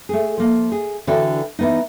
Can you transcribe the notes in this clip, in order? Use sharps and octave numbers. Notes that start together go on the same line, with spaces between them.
A3 G#4
F3 A#3
G#4
D3 E3 F#4 D5 G5
E3 B3 D#4